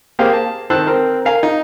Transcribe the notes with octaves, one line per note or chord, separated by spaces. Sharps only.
A#3 G4 G#4 C5 F5
A5
D#3 C5 A5 E6 F#6
C4 A#4
A#4 F5 G#5
D#4